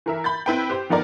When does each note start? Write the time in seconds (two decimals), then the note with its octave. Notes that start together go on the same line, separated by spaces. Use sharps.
0.06 E3 A#4 E5
0.24 B5 G6 A6
0.46 C4 E4 B4 G5
0.70 G4 C5
0.90 D#3 F3 B3 D#4 A#4 D5